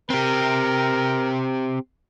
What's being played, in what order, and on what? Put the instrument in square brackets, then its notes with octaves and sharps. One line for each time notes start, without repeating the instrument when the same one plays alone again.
[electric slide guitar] C4 G4 [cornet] A#4